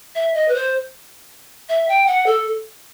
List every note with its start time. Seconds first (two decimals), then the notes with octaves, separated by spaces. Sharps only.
0.15 E5
0.34 D#5
0.48 B4
0.54 C5
1.69 E5
1.89 G5
2.07 F#5
2.26 A4